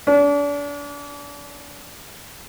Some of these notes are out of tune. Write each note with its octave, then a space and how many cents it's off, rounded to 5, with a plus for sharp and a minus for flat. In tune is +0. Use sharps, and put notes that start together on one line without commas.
D4 -35